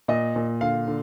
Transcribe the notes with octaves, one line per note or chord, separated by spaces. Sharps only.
A#2 D#5
A#2
D3 F5
D3